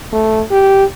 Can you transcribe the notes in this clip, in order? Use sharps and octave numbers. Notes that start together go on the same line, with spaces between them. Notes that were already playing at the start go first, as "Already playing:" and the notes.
A3
G4